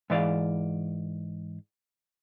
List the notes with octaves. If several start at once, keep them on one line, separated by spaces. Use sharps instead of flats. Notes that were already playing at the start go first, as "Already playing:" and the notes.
G#2 E3 D5 F5